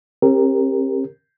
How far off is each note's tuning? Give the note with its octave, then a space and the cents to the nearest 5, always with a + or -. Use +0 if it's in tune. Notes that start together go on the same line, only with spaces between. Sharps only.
C4 +45 G4 +20 A#4 +0